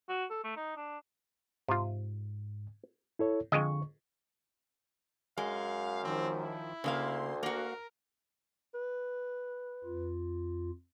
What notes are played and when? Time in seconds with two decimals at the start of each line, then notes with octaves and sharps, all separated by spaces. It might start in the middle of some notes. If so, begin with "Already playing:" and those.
0.09 F#4
0.30 A4
0.44 A3
0.56 D#4
0.76 D4
1.68 G#2 C3 F4
3.19 E4 A4 C#5
3.52 F2 D3 G#3 D#5 C#6
5.38 F#2 G#3 F5
6.04 D#3 F3 C4
6.44 E4
6.84 D2 C#3 A#3 F5 C6
7.43 A#3 F#4 A#4 F5 F#5
8.74 B4
9.84 F2 F4